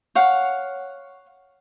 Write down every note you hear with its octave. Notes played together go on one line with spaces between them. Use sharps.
C#5 F5 F#5